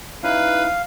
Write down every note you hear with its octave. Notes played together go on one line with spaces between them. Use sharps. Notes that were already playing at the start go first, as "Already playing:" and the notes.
C#4 D#4 E4 B4 F5